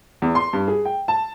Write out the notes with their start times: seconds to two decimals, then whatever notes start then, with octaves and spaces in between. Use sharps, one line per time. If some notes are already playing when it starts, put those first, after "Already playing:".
0.22 E2
0.35 C6
0.53 G2
0.68 G#4
0.85 G5
1.08 A5